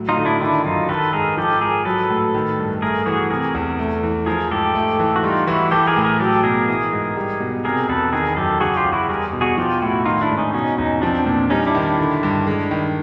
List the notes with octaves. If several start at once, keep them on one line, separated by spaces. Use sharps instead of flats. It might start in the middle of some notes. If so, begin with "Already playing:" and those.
Already playing: A2 F#3
D#4 F4
D3
D4 E4
D#3 D4 E4
F#2 D#4 F4
D#3 A4 B4
G#2 G#4 A#4
F3 G4 A4
G#2 G#4 A#4
F#3 A4 B4
A2
D#3
G2
A3 G#4 A#4
E3 F#4 G#4
C3 G#4 A#4
E2
A3
E3
F3 G#4 A#4
G#2 G4 A4
A3
E3
F#4
G3 D#4 F4
E3 E4 F#4
E3 G4 A4
G#4 A#4
A2
G#4 A#4
F#3 G4 A4
B2 G#4 A#4
E3
G#2
G3
B2
C3 G#4 A#4
E2 A4 B4
D#3 G#4 A#4
F#2 G4 A4
C#3 F#4 G#4
F4 G4
E2
E4 F#4
G3 G#4 A#4
B2
F#4 G#4
F3 F4 G4
A2 E4 F#4
D#3 D#4 F4
D4 E4
G#2
C#4 D#4
B2 C#4 D#4
E2 C#4 D#4
F3 C4 D4
A#2
G3 C#4 D#4
D4 E4
D#3
D4 E4
D3
G2
G#3
D#3